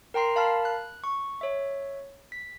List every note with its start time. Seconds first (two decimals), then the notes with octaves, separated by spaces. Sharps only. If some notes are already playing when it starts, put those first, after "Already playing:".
0.14 A#4 G5 A#5 C6 C7
0.35 A#4 F5 A5 B5 F6
0.65 F#6
1.04 C#6
1.41 C#5 E5
2.32 B6